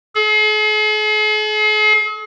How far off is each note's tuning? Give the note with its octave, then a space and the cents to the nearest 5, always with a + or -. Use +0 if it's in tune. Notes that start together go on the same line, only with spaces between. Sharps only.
G#4 +45